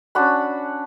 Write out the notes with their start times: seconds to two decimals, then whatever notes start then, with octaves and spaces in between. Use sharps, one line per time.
0.15 C#4 D4 F#4 B5